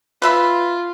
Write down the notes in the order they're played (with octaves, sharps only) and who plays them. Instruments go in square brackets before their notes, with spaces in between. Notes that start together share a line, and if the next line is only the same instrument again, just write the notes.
[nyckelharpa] F4 [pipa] B4 E5 B5